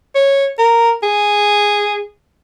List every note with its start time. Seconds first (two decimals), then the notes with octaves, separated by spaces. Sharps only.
0.15 C#5
0.59 A#4
1.03 G#4